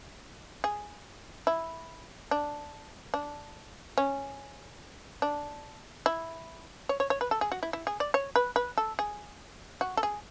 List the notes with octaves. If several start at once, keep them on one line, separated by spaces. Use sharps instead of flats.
G#4
E4
D4
D4
C#4
D4
E4
C#5
C#5
C#5
B4
A4
G#4
F#4
E4
E4
G#4
D5
C#5
B4
B4
A4
G#4
F#4
A4
G#4